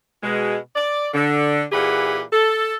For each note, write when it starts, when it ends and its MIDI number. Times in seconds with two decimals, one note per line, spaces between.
0.23 0.56 47
0.23 0.56 56
0.76 1.08 74
1.14 1.63 50
1.72 2.21 46
1.72 2.21 52
1.72 2.21 67
1.72 2.21 68
1.72 2.21 78
1.72 2.21 83
2.32 2.74 69